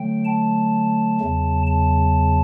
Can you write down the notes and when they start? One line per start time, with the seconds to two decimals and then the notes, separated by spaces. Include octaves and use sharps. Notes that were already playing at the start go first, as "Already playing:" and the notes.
Already playing: D3 F#3 A3 G5
0.25 A5
1.20 E2 C#3 F#3
1.67 A5